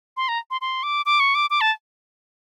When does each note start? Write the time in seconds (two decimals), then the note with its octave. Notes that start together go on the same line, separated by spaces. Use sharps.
0.17 C6
0.28 A#5
0.51 C6
0.61 C6
0.83 D6
1.06 D6
1.20 C#6
1.35 D6
1.50 D6
1.61 A5